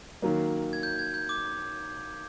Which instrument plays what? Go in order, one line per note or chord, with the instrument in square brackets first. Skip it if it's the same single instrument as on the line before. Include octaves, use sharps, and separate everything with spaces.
[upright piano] D#3 F#3 A#3
[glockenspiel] G#6
G6
G#6
G6
D6